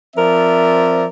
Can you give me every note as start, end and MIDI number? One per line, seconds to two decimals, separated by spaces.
0.16 1.05 53
0.16 1.05 60
0.16 1.05 70
0.16 1.05 74
0.16 1.05 76